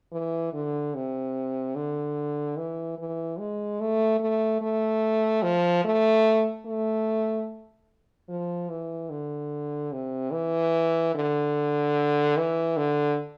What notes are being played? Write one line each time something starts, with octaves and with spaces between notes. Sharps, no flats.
E3
D3
C3
D3
E3
E3
G#3
A3
A3
A3
F3
A3
A3
F3
E3
D3
C3
E3
D3
E3
D3